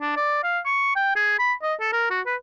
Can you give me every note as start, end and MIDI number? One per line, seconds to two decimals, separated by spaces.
0.01 0.14 62
0.17 0.41 74
0.43 0.59 77
0.66 0.92 85
0.96 1.11 79
1.16 1.34 68
1.39 1.53 83
1.62 1.74 75
1.80 1.90 69
1.93 2.08 70
2.10 2.21 66
2.26 2.36 71